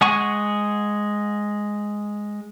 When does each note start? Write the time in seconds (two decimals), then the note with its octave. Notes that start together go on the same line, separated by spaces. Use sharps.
0.01 G#3 G#4 F#5 G#5 C#6